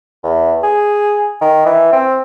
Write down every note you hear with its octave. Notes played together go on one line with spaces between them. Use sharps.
E2
G#4
D#3
E3
C4